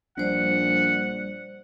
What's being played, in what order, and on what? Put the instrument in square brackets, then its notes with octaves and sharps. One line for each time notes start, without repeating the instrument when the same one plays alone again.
[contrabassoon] A#1 [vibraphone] G3 C5 D5 [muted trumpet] F#5